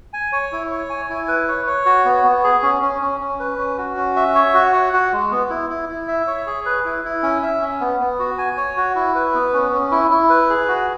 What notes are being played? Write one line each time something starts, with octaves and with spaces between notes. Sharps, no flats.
G#5
C#5
E4
C#5
G#5
E4
B4
C#5
C#5
F#4
B3
B3
G#4
C#4
C#4
C#4
C#4
B4
C#4
F#4
C#4
E5
C#5
F#4
F#5
F#4
G#3
B3
E4
E4
E4
E5
C#5
G#4
B4
E4
E4
C#4
E5
C#4
B3
B3
F#4
G#5
C#5
F#4
E4
B4
B3
C#4
C#4
E4
E4
B4
G#4
F#4